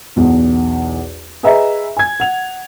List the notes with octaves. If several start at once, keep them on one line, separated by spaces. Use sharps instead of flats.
B1 E2
G#4 B4 D#5 E5 A#5
G#5 G#6
F#5 F7